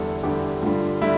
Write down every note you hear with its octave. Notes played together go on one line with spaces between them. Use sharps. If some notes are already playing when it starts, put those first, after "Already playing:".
Already playing: E2 D3 G3 A4
E2 D3 G3 G4
G2 D3 G3 F4
D3 G3 E4